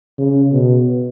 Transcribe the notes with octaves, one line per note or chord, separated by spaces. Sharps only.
C#3
B2